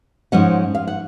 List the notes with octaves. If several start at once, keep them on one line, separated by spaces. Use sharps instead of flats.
G#2 F3 G#3 C#4 D#5 F#5
F5
F#5